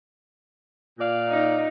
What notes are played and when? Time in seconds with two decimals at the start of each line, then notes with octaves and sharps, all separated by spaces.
0.98 A#2 D5 F5
1.29 D#4